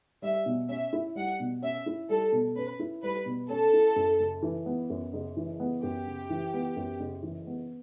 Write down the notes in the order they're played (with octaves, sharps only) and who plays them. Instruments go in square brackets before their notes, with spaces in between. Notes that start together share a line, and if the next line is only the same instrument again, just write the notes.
[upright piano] G3 [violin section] E5
[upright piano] B2
[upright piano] C#4 [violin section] E5
[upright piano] E4
[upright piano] G3 [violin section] F#5
[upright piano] B2
[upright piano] C#4 [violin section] E5
[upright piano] E4
[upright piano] G3 [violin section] A4
[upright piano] B2
[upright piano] C#4 [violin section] B4
[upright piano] E4
[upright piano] G3 [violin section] B4
[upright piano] B2
[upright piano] C#4 [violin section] A4
[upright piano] E4
F#2
F#1
E3
B3
F#2
F#1
E3
B3
[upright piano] F#2 [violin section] G4
[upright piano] F#1
E3
B3
F#2
F#1
E3
B3